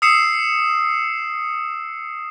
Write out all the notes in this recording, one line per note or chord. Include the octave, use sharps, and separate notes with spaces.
D#6 E6 C7 C#7 E7